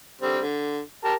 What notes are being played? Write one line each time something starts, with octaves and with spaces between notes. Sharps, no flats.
D3 G3 C4
D3
G4 A#4 A5